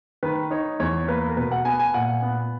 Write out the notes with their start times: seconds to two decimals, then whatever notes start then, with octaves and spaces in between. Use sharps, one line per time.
0.23 D#3 B4
0.51 D#4 C#5
0.80 E2 C#5
1.08 A#3 B4
1.29 A#4
1.37 B2 B4
1.51 F#5
1.65 B3 G#5
1.80 G#5
1.94 A#2 F#5
2.22 B3